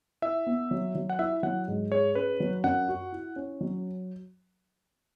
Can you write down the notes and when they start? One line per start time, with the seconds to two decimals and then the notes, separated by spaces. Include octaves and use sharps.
0.22 E4 E5
0.47 B3
0.71 F#3
0.95 F#3
1.09 F#5
1.19 E4 E5
1.43 F#3 F#5
1.68 G#2
1.91 G#4 C#5
2.15 C#4 B4
2.40 F#3
2.64 F#2 F#5
2.88 F#4
3.12 E4
3.36 C#4
3.61 F#3